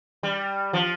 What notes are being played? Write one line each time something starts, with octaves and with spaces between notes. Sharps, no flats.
G3
F3